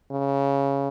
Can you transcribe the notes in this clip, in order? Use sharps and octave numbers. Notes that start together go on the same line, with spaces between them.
C#3